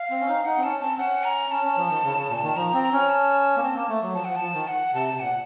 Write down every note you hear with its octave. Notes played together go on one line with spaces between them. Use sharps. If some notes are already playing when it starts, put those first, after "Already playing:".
Already playing: F5
C4
C#4
D#4
D#4 F#5
C4
C#4 A5
C4 A5
C#4 F#5
A#5
C#4 A5
C#4
F3
D#3
C#3
C#3
A#2
D#3
F3 A#5
C4
A#5
C#4
A5
A#3
C4
A#3
A3
F#3
F3 A5
F3 F#5
A5
F3
D#3
F#5
C3 A5
C3
A#2 F#5